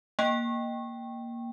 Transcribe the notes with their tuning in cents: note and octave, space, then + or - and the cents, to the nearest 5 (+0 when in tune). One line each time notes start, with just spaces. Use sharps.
A#3 +10 G5 +0